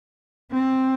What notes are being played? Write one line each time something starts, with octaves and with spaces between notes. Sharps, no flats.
C4